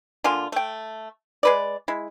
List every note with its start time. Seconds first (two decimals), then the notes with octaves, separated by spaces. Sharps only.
0.24 D3 A#3 F4 G#5
0.52 A3 G5
1.43 G#3 B4 D5
1.88 G#3 E4